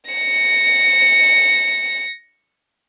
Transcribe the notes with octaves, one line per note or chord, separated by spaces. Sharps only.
A#6 C#7